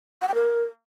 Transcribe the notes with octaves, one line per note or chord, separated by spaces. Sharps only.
F#5
G5
A#4